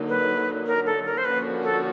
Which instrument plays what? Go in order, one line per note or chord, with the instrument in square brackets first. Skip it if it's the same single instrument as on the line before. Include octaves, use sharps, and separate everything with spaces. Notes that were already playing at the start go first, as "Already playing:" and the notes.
Already playing: [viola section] D3 F#3 A#3 D#4
[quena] B4
A#4
A4
A#4
C5
[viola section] D3 F3 A#3 C#4 F#4 [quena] B4
[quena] A4